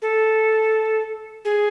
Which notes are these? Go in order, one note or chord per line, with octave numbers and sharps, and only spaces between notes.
A4
G#4